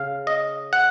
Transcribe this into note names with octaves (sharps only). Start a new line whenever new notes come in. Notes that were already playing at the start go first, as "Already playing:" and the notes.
Already playing: C#3 F5
D#5
F#5